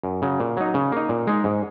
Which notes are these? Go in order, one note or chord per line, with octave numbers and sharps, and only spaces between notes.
F#2
C#3 F#3
A#2
F#3 D#4
C#3
A#3 D#4
A#2
G#3 D#4
G#2